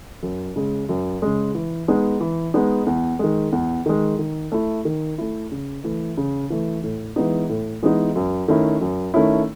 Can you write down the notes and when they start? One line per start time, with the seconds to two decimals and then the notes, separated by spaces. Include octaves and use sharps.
0.23 F#2
0.56 C#3 G#3
0.89 F#2
1.22 C#3 G#3
1.55 E3
1.88 G#3 B3 D#4
2.20 E3
2.54 G#3 B3 D#4
2.86 E2
3.19 D#3 G#3
3.52 E2
3.86 D#3 G#3
4.19 D#3
4.52 A3 E4
4.85 D#3
5.18 A3 E4
5.51 C#3
5.84 E3 A3
6.17 C#3
6.50 E3 A3
6.83 A2
7.16 E3 G#3 B3 D#4
7.49 A2
7.83 E3 G#3 B3 D#4
8.16 F#2
8.48 D#3 A3 C#4 E4
8.81 F#2
9.14 D#3 A3 C#4 E4